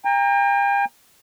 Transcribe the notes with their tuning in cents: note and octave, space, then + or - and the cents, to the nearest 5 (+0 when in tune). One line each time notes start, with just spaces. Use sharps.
G5 +40 A#5 -5